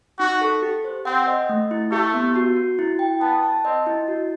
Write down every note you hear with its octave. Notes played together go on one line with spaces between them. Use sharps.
D#4 F#4
A4
G4
C5
C4 F#5
D#5
A3
E4
A3 G4
B3
F#4
F#4
E4
G5
B3 A5
A5
C4 D#5
E4
F#4